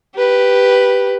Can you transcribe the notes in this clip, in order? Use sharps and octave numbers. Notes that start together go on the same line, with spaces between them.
G4 B4